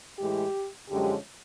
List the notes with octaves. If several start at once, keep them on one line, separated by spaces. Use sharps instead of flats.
A2 E3 G#3 G4
F#2 D3 F3 G#3 C#4 G4